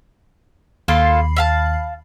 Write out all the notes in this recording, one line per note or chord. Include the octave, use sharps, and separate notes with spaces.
D#2 A#3 F4 A4 B5 C7
E5 F5 A5